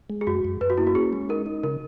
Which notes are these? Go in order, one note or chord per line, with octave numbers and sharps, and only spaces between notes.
G#3
G#4
F#2 F#4
F#2
F#2 B4
F#4
A#3 E4
F#4
C#4 G#4
G#3
D#4 A#4
D#4
C#3 A#4